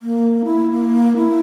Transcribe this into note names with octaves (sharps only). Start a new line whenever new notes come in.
A#3
E4
A#3
E4